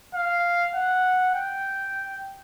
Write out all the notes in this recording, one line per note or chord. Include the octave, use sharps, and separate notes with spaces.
F5
F#5
G5